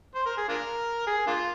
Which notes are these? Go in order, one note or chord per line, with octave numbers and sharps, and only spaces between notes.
C5
A#4
G#4
D4 F4 A#4
G#4
A#3 D4 F4